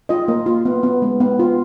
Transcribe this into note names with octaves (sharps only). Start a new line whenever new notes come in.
F4 D#5
A#3
F4
B3
B3
G#3
B3
F4